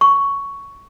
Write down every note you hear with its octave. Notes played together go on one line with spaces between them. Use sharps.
C#6